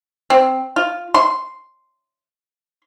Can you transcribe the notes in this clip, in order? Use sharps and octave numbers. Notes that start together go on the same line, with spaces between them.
C4
F4
C6